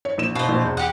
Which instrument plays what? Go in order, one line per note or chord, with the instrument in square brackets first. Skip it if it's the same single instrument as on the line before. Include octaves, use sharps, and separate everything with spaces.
[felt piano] C#5
A#1 E7
[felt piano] B2 [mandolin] F4 C5
[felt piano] A#1 B2
E2
[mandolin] G4 F#5